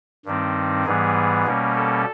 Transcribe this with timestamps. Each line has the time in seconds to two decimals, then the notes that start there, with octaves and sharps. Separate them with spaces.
0.25 G2 D#3 G3 C4 D#4
0.85 G#2 E3 G3 B3 G#4
1.45 B2 G3 A#3 C#4
1.75 A4